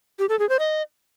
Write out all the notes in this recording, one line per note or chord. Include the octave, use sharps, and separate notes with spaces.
G4
A4
G#4
C5
D#5